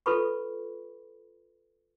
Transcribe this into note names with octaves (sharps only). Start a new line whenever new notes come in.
F4 A4 B4 B5 C#6